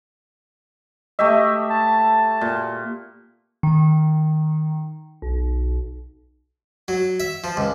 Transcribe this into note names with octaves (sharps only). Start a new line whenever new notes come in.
A3 G4 D#5 E5
A5
A#2
D#3
B1
F#3
E5
F3
C#2